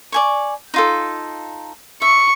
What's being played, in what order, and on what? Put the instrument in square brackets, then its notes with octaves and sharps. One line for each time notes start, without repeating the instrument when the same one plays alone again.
[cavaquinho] D5 G#5 C#6
D#4 F4 A4
[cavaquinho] E5 [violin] C#6